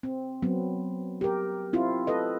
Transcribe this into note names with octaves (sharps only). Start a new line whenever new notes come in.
C4
F#3 B3 C4
G4 A#4
C4 E4 F4
A4 B4 D#5